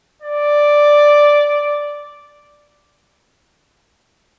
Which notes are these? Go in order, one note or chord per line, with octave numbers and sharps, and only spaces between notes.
D5